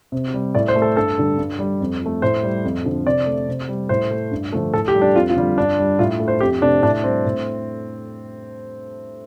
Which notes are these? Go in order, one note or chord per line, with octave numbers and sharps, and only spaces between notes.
C3
G3
A2 D5
C5
A3
A4
G2 A4
D3 G3
G2
G3
F2
F3 A3
A2 C5
G3
F2
D3 F3
C3 D5
A3
C3
G3
A2 C5
A3
G2
D3 F3 A3
A2 A4
G4
G3
D4
F2 F4
F4
D3 G3
G2 D4
G3
A2 F4
A3
C5
F2 G4
C3 A3 D4
A2 D4
G3 C4
A2